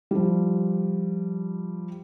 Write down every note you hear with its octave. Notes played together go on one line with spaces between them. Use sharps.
F3 G3